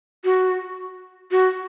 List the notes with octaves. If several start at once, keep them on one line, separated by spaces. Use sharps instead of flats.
F#4
F#4